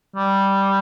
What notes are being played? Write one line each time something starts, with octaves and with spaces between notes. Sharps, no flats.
G3